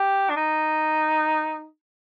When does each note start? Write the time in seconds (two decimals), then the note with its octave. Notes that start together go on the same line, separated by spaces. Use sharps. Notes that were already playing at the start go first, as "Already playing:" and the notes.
Already playing: G4
0.30 D4
0.36 D#4